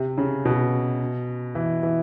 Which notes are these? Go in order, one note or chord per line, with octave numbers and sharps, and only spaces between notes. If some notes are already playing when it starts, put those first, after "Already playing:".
Already playing: C3
C#3
B2
E3
E3